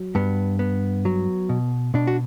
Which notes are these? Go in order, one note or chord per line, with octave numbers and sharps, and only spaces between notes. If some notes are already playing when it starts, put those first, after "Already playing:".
Already playing: F#3
G2 B3
B3
F#3
B2
B2 D4
F#4